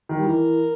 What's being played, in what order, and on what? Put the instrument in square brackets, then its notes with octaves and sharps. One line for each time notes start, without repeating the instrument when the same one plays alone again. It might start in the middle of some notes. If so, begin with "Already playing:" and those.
[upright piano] D#3
G3
[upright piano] E3 [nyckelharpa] A#4